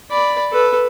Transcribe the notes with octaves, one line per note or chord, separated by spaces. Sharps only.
D5 B5
A4 B4